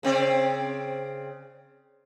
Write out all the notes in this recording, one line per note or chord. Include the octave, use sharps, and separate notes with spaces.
C#3 C4 D5